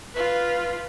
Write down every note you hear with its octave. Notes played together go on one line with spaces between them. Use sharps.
F4 B4